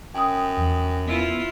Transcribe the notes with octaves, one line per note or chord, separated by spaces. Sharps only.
F#2 G5 D#6
E2 F#3
B3 E4 F4